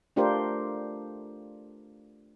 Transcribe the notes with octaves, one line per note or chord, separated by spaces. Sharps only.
A3 D4 F4 G4 A#4 C5